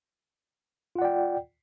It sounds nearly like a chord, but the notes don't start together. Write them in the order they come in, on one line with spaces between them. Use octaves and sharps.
F4 F#5 D5 G5